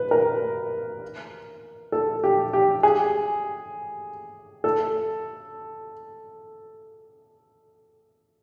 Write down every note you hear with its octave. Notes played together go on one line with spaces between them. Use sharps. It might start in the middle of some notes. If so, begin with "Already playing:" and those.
Already playing: B4
A#4
A4
G4
G4
G#4
A4